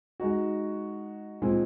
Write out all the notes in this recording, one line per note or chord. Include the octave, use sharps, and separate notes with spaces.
G#3 D#4 F#4
A#2 F3 G#3 C4